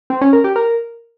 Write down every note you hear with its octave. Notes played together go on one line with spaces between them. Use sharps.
C4
C#4
A#4
G4
A#4